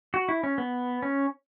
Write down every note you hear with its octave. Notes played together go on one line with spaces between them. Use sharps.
F#4
E4
C#4
B3
C#4